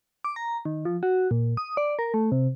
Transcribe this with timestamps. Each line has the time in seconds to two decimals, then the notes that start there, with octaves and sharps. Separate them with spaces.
0.24 D6
0.36 A#5
0.65 D#3
0.85 F3
1.03 F#4
1.31 A#2
1.57 D#6
1.77 D5
1.99 A#4
2.14 A3
2.32 C3